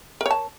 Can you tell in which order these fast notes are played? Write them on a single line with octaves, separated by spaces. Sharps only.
A#4 C#5 A5